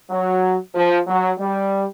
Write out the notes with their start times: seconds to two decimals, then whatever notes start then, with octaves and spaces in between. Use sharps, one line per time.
0.10 F#3
0.74 F3
1.07 F#3
1.39 G3